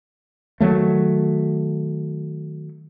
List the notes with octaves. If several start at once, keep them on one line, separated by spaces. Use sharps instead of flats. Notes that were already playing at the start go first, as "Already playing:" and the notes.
D#3 F#3 A3